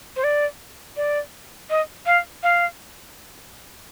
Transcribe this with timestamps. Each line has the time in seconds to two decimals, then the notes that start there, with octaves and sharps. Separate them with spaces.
0.16 C5
0.24 D5
0.97 D5
1.70 D#5
2.06 F5
2.43 F5